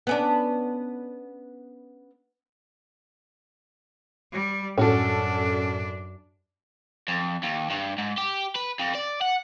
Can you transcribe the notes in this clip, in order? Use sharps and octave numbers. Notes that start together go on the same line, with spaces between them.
B3 C#4 D4
G3
F#2 A2 C#4 D4 F#4 A4
F2
D#2
G2
G#2
G4
B4
F2
D5
F#5